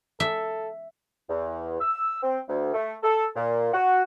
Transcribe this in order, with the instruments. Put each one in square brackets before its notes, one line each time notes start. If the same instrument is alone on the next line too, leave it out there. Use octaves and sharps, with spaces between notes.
[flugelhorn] A4 [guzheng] E5
[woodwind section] E2
E6
C4
D2
A3
A4
A#2
F#4